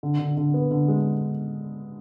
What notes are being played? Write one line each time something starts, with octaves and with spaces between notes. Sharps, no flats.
D3
D3
D3
B3
D3
G#3